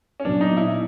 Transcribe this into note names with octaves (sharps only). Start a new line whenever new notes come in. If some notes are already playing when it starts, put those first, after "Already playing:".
C#4
A#2 F#3 B3 D4
D#4
E4